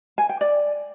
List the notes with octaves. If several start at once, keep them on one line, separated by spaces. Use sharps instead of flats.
G#5
G5
D5